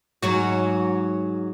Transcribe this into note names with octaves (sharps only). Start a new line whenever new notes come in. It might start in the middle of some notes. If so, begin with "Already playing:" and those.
G#2 F#3 F#4